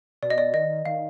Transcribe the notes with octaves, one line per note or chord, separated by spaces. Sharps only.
B2 D5
D#5
D5
D#3 D#5
D#3 F5